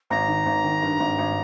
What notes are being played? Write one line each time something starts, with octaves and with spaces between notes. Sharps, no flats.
G#1 A#5
D#3
G#1
D#3
G2
G#1
G#1